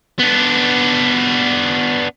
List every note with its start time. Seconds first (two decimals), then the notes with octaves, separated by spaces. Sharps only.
0.19 B3 D4